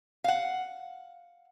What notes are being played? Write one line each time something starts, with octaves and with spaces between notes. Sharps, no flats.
F5 F#5